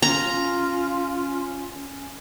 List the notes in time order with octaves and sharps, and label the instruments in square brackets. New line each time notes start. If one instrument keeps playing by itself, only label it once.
[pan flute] C#4 [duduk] F4 [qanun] A#5